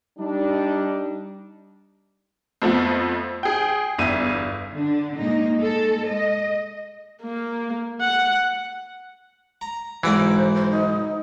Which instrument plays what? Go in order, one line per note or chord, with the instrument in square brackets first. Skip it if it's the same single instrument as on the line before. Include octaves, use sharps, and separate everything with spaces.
[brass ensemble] G3 D4 D#4
[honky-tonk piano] F2 F3 A3 B3
G#4 G5
G1 E2 E5 D#7
[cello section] D3 D4
A#2 G#3 A#3 D#4
G#3 A4
D#5
[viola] A#3
F#5
[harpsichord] A#5
[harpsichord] B1 G#2 D5 [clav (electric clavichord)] E3 [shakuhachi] C5
[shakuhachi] C5
D#4